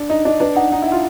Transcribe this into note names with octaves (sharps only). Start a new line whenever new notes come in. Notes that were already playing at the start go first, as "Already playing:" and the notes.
Already playing: D4
D#4 D#5
D4 D#5
D4 B4
D#4 F#5
D#4 F#5
E4
F4 F#5